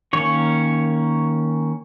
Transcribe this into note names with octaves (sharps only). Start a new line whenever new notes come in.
D#3 A#3 C#4 C#5